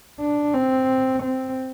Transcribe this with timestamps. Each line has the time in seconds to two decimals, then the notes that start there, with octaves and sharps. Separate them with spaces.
0.21 D4
0.54 C4
1.23 C4